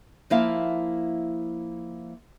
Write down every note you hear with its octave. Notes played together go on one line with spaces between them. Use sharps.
F3 A#3 E4 E5 F5